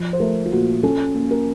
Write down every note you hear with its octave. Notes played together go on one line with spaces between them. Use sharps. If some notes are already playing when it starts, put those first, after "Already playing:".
Already playing: F3
C5
A3 A#4
F4
A#2 F#4
C#4 A4
A#3
A#4